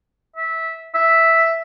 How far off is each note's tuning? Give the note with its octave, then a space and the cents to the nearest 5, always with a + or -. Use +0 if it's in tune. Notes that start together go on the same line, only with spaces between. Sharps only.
E5 -15
E5 +0